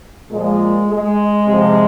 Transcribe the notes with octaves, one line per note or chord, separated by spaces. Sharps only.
A#2 F3 G#3
G#3
C3 F3